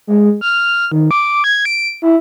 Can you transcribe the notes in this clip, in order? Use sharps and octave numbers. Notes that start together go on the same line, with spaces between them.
G#3
F6
D#3
D6
G#6
D7
E4